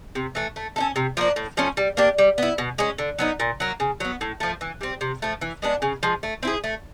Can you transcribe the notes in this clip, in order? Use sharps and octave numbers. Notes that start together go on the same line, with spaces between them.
C3
E3 A3
A3
C#4 E4 A4
C3
F3 A#3 D4
A2
F3 A3 C#4
G3
A#3 D4 G4
G3
B3 E4
B2
G#3 C#4
D3
F#3 B3 D#4
A#2
F#3 A#3
C#3
F#3 B3
A2
F3 A3
E3
G3 C4
C3
F3 A3
E3
G#3 B3 D4
C#3
F3 G#3
A3
C4 E4 G#4
A3